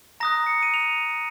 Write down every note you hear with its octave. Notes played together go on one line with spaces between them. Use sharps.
A#5 D#6 F#6 A#6
C#7
D#7
F7